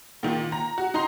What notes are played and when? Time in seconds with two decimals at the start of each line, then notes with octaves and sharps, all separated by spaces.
0.23 A#2 D#3
0.52 A#5
0.78 F#4
0.94 D#4 A#5 C6